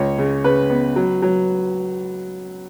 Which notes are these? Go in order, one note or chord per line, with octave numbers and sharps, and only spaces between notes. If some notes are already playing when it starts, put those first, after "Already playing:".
Already playing: C#2 C#5
C#3
C#3 B4
B3
F#3
F#3